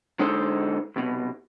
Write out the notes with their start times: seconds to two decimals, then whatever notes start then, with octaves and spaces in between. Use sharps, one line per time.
0.19 D3 G#3 D#4 A4 C5
0.96 C2 B2